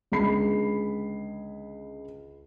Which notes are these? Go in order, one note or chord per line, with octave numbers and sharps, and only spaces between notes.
C#2 D3 G#4 B5 C7